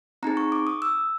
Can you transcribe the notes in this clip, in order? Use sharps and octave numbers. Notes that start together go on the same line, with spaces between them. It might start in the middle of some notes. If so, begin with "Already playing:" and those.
C4 D#4 G#4 A#5
C#6
D6
D#6
E6